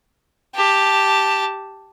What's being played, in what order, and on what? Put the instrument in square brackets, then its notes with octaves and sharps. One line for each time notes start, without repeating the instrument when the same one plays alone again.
[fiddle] G4 A5